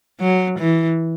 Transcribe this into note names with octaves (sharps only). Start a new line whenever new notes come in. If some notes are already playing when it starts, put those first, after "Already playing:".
F#3
E3